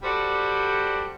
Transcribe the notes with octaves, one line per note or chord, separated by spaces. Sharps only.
G3 F#4 G4 A4 C5 D5